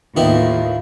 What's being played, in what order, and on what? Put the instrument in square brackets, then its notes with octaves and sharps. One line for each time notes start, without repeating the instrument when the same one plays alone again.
[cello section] D#2 A2 [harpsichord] D#3 B3 E4 [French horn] F4